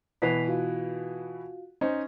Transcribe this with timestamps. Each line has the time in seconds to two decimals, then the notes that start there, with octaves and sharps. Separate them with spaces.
0.22 B2 E3 B4 B6 C7 F7
0.47 F4 F#4 F5
1.81 C#4 D#4 C5